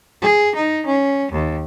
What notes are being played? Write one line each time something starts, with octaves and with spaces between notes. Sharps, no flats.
G#4
D#4
C#4
D#2